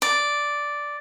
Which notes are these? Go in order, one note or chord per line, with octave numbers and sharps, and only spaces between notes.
D5